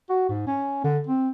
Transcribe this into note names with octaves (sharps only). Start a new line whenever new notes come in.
F#4
G#2
C#4
D3
C4